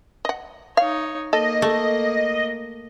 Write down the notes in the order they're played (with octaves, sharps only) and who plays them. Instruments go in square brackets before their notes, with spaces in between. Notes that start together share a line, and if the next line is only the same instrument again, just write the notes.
[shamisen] D#5 F#5
[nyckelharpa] D#4 C#5 [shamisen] F5
[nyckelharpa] A#3 [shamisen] A4 [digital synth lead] D#5
[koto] A3